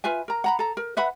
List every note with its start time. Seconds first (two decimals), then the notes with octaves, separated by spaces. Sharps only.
0.04 F4 B4 E5 G#5
0.28 A#4 A#5
0.44 F#5 A#5 B5
0.59 A4 A#5
0.77 A#4
0.97 B4 E5 F#5 B5